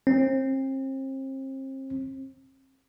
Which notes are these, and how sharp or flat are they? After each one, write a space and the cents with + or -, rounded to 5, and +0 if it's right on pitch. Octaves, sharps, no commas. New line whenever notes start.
C4 +35